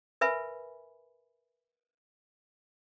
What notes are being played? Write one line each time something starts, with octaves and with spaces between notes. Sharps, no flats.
A#4 B4 E5 G#5 B5